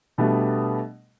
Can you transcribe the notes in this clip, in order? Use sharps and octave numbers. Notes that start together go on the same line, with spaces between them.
B2 G3 A3 B3 D4